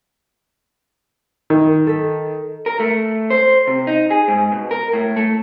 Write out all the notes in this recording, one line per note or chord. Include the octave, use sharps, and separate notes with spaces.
D#3
A4 B6
A#4
A3
C5
C3
D#4
G#4
G#2
B2
A#4
A2
A3